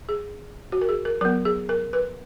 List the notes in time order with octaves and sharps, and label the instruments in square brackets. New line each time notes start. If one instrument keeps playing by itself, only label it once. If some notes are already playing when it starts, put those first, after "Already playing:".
[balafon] G#4
F#4
A#4
G#4
A#4
F#3 B3 A#4
G#4
A#4
B4